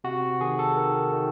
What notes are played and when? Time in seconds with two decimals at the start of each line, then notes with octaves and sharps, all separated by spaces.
0.04 C3 F#4
0.41 D#3 G#4
0.59 A4
0.77 D#3 A#4
1.13 D#3